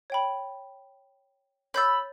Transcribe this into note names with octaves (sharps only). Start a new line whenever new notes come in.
C#5 G5 B5
C#5 B5 E6 G6 A6